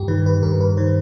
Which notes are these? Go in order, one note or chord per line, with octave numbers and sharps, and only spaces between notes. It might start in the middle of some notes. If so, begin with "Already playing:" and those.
Already playing: G2 G4
D#3 B4
B4
G2 A#4
B4
D#3 C5